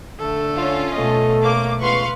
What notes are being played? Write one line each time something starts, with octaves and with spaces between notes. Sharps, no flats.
D3 A3 A4
C#4 F4
B2 A3 A4 D#5
A#3 C#5 D6
C#2 B3 B4 F5 C6 C#6